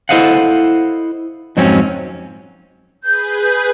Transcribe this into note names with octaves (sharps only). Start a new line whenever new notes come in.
E4 A4 C5 D#5 F5 F#5
F2 G#2 F#3 C4 C#4
G#4 B4 G6